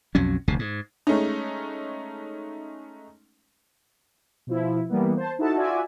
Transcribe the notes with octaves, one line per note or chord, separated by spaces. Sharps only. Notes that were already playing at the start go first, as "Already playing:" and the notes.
B1 F2 F#3 C#4
F1 D2 C3
G#2
G#3 A3 C#4 D#4
B2 F3 E4
E3 G3 A#3 B3
C5 A5
D#4 E4 F#4 A4 A5
F4 F#4 D5 E5 G#5